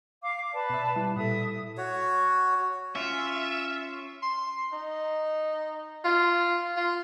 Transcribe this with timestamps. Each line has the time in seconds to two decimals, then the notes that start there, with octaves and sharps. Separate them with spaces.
0.23 F5 D6
0.52 B4 D5 A5
0.70 B2 E5
0.96 G3 E4
1.16 A#2 G3 A4 E5 D#6
1.78 F#4 C#5
2.96 C#4 F4 E5
4.22 C6
4.72 D#4
6.04 F4
6.76 F4